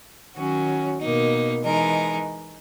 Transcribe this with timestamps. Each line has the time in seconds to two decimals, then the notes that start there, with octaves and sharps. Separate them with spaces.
0.36 D#3 F#3 C#4 F#4
0.99 B2 A#3 D#4
1.64 E3 G#3 D#4 A#4